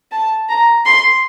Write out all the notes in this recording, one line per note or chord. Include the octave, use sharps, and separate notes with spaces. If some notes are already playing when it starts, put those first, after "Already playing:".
A5
A#5
C6